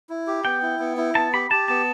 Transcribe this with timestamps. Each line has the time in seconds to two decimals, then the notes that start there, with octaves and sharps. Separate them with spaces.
0.09 E4
0.27 G4
0.45 B3 G5
0.62 E4
0.80 B3
0.97 E4
1.15 B3 A5
1.33 G4 B5
1.51 G4 A5
1.68 B3 A5